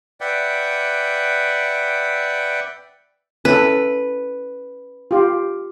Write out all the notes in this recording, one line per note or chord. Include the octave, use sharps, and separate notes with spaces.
B4 D5 E5 F#5 G5
C#4 E4 A4 B4
F4 G4